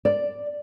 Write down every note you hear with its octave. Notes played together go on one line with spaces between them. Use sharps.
D5